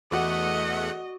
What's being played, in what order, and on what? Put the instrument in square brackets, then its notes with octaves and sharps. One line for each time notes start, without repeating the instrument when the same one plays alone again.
[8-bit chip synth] E2 A3 F#5 [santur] F#4 D5 [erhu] D#5